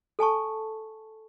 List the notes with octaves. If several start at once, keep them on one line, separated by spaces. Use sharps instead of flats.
A4 G#5 A5 C#6